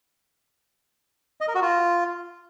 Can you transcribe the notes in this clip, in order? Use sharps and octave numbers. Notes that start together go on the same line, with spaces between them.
D#5
A#4
F#4
F4